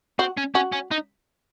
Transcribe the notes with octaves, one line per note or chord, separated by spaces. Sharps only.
C4 F#4
C#4
C#4 F#4
C#4
D#4